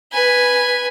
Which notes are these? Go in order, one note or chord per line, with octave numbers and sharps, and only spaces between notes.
B4 G#5